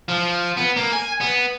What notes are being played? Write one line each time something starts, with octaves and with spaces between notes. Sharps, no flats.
F3
B3
A#3
G#5
B3